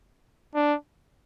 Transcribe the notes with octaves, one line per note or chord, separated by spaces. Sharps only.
D4